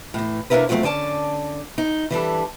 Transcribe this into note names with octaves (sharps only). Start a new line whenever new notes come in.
A2 E3
C3 A#3 D4 E4 A#4 B4
F3 F#3 A3 A#3 C4
D3 C#4 D5 A5
D#4
E3 G3 D4 A4